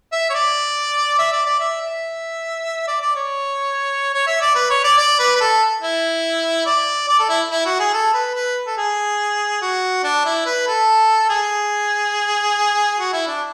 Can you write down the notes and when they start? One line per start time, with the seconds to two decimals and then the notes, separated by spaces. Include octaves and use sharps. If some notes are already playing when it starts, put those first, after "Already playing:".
0.12 E5
0.30 C#5
0.34 D5
1.19 E5
1.32 D5
1.46 D5
1.60 E5
1.81 E5
2.88 D5
3.01 D5
3.16 C#5
4.14 C#5
4.27 E5
4.41 D5
4.55 B4
4.70 C#5
4.84 D5
4.98 D5
5.19 B4
5.36 B4
5.41 A4
5.82 E4
6.66 D5
7.08 D5
7.19 A4
7.29 E4
7.51 E4
7.66 F#4
7.80 G#4
7.94 A4
8.14 B4
8.35 B4
8.66 A4
8.77 G#4
9.62 F#4
10.04 D4
10.26 E4
10.46 B4
10.68 A4
11.30 G#4
12.98 F#4
13.13 E4
13.27 D4